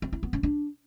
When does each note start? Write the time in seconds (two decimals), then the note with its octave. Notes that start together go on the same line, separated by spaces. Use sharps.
0.02 C4
0.12 E4
0.23 B3
0.33 C#4
0.43 D4